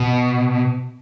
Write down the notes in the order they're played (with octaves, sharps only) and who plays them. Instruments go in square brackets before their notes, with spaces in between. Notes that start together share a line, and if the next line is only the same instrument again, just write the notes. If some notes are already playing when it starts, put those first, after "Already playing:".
Already playing: [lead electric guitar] B2